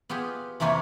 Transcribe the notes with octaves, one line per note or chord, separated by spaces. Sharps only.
B3 F4 G4 G#4
F2 C3 E3 A#3 F4 C#5